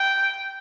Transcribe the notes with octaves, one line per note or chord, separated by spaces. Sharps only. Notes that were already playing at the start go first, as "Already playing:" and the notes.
Already playing: G5